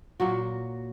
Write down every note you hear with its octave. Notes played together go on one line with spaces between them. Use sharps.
A#2 F#3 F#4